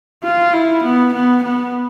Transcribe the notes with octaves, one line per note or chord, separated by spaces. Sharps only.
F4
E4
B3
B3
B3